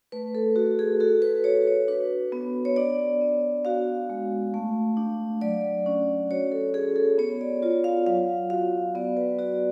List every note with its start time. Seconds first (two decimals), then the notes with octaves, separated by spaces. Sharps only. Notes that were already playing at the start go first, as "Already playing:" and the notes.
0.12 A3 B4
0.35 A4
0.56 F#4
0.79 G#4
1.00 F#4 A4
1.22 B4
1.44 F#4 C#5
1.67 C#5
1.88 D4 B4
2.32 B3
2.65 C#5
2.76 D4 D5
3.21 B3
3.65 F#4 F5
4.10 G#3
4.54 A3
4.97 D4
5.41 F#3 D5
5.86 C#4
6.31 F#4 C#5
6.52 A4
6.74 F#4 G#4
6.96 A4
7.18 B3 C#5
7.41 D5
7.62 F4 C#5
7.84 F5
8.06 F#3 F5
8.50 F#4 F5
8.95 B3 D5
9.17 B4
9.39 F#4 D5